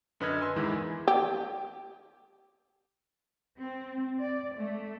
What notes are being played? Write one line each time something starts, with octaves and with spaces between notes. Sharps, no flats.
F#2 D3 B4 D#5 F6 G#6
G#5 C6 E6
E2 G#2 D#3 E3 G#3 E4
G4
C4
D5
A3